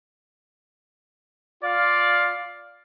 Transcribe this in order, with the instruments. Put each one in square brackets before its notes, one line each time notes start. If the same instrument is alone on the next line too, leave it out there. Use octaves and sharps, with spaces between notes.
[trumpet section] F4 D5 F5